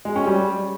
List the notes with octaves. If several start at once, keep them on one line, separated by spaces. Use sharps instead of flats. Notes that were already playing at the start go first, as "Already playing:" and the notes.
G#3
C#4
G3